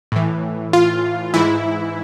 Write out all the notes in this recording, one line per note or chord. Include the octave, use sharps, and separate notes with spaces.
A2 E3
F4
G#2 E3 E4